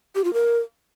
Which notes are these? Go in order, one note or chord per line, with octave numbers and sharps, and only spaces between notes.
G4
F4
A#4